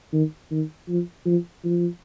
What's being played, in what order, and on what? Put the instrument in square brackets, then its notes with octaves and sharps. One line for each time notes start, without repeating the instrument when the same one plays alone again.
[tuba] D#3
D#3
F3
F3
F3